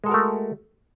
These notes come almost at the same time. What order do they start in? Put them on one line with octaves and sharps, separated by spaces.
G#3 A4 F#4 A#4 A3